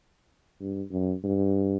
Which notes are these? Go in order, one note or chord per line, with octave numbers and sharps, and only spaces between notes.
G2
F#2
G2